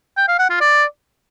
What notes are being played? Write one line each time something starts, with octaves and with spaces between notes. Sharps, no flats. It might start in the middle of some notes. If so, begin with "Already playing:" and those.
G5
F5
F#5
F4
D5